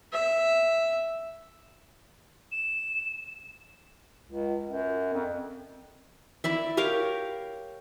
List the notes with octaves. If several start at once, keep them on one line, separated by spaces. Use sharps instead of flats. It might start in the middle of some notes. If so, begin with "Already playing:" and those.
E5
E7
C#2
F#2
F2
E4 D5 E5
G4 A#4 C#5 F5